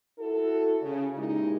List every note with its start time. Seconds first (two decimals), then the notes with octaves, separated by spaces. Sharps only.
0.19 E4 F#4 A4
0.82 C#3
1.17 A#2 G#3 D#4 E4 G4